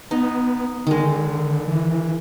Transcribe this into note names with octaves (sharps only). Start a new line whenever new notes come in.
B3 D#4
D3 D#3 G#3
E3